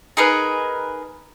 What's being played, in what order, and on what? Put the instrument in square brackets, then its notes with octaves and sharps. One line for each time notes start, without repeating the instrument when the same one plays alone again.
[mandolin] D#4 G#4 A#4 B4